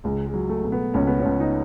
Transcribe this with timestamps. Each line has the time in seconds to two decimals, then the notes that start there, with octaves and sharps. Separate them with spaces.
0.04 C#2 G#3
0.26 G#3
0.34 F#3
0.49 A3
0.65 B2
0.72 B3
0.94 C#2 C#4
1.07 B3
1.20 C#4
1.25 C#2
1.40 D#4